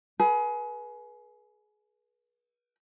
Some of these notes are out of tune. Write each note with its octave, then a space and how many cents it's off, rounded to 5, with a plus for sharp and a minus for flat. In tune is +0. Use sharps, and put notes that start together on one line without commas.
G#4 +25 B4 -30